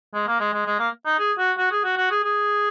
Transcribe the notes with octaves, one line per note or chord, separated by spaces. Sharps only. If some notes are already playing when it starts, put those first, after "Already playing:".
G#3
A#3
G#3
G#3
G#3
A#3
D#4
G#4
F#4
F#4
G#4
F#4
F#4
G#4
G#4